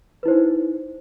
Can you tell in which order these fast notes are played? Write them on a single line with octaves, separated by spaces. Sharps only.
B4 E4 C5 D#4